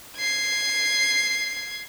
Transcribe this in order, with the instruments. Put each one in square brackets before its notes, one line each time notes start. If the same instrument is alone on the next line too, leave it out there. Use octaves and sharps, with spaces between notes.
[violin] G#6 C7